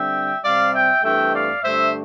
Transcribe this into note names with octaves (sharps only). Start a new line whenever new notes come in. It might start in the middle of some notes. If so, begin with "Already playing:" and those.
Already playing: D3 G3 C4 E5 G5
C3 G3 C4 D5 F5
E5 G5
G2 E3 A3 C4 E5 G5
D5 F5
G2 D3 A3 C5 E5